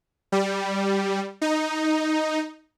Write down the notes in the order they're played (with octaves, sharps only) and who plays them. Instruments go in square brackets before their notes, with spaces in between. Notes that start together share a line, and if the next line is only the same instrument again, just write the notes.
[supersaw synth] G3
D#4